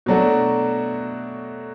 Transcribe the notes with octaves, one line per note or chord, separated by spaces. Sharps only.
B2 F#3 A3 D4 F#4